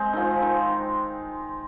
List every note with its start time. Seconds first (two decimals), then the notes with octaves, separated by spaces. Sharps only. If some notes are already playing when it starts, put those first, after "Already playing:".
Already playing: G#3 C4
0.13 D#3 F3
0.42 D#3